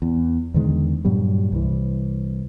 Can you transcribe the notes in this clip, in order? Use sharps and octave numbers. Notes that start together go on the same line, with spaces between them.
E2
E2 D3 D#3 G#3
G2 A#2 F#3 G3
C2 E3